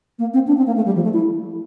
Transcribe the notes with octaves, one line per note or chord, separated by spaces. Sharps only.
A#3
C4
D4
C4
A#3
A3
G3
F3
A3
E4